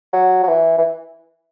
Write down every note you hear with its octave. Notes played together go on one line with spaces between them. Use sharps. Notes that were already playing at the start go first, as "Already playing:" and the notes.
F#3
F#3
E3
E3